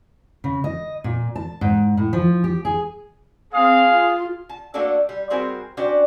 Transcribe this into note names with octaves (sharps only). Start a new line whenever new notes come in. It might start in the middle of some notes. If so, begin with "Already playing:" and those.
C#3
D#5
A#2
A5
G#2
A2
F3
G4
G#4
C4 G#4 F5
F4
A5
A3 A#3 D4 F#4 A4 D5
G3
G3 C4 F#4 G#4 A#4 C5
C#4 D4 F#4 C5 D5 G5